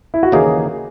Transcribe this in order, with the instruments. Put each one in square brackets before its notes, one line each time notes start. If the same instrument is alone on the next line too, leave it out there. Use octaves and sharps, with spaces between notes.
[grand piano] E4
F#4
[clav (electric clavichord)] D#2 C#3 E3 A#3 D#4 [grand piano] G#4